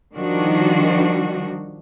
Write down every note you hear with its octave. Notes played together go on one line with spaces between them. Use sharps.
D#3 F3 G3 D4 D#4 F#4